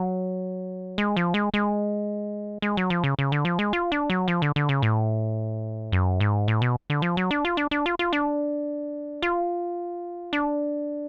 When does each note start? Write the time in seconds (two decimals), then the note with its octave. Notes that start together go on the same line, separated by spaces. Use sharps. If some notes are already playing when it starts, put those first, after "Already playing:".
Already playing: F#3
0.98 G#3
1.17 F3
1.34 G#3
1.54 G#3
2.62 G#3
2.77 F#3
2.90 F3
3.04 C#3
3.19 C#3
3.32 D3
3.45 F3
3.59 G#3
3.73 F4
3.92 D4
4.10 F#3
4.28 F3
4.42 D3
4.56 D3
4.69 C#3
4.82 A2
5.92 F#2
6.20 G#2
6.48 A2
6.62 B2
6.90 D3
7.02 F3
7.17 F#3
7.31 D4
7.45 F4
7.57 D4
7.71 D4
7.86 F4
7.99 F4
8.13 D4
9.22 F4
10.33 D4